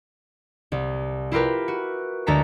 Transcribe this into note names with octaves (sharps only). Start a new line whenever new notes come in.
C2
E4 F4 G4 A#4 B4
F#4
D2 G#3 A4 A#5 B6